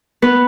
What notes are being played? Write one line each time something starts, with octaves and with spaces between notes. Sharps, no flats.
B3 B4